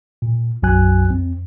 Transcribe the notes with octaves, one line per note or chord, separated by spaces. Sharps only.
A#2
B1 F#2 F#3 F#4 G#5 F#6
F2 C4